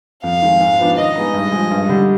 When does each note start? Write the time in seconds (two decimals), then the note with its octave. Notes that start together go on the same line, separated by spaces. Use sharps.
0.24 F2 F5
0.42 D#3 G#3
0.60 G#2
0.79 F3 B3 D4
0.97 D#3 D#5
1.16 G#3 B3 D#4
1.34 G2
1.52 F3 G#3
1.71 G2
1.89 D3 G3 D4